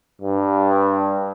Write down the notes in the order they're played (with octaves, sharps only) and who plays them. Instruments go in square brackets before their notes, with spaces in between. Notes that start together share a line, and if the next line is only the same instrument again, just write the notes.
[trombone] G2